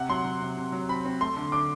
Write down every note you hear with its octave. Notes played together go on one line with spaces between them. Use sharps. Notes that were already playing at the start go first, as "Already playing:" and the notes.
Already playing: C3 F#5
F#3 C6
F#3
C3
C3
F#3
C4 B5
C4
A3 C6
D3
D3 D6